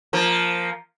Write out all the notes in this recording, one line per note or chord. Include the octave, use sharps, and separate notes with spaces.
F3 A#3